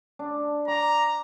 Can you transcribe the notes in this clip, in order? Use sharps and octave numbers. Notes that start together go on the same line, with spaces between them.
D4
A#5 D6